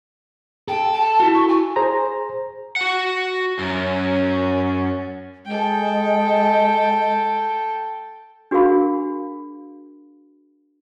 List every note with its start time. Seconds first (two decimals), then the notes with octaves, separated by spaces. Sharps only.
0.68 A4 G5
0.93 A5
1.20 E4 F#4
1.34 C#6
1.48 G#5
1.76 G#4 C5 A#5
2.76 F#4 F#5
3.59 F#2 C#4
5.45 G#3 A4 G5
8.51 D4 F#4 G#4 A#4 F5 B5